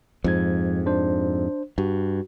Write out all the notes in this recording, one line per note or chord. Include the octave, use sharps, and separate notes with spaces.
F2 G#2 F3 G#6
D4 C5
G2 F#4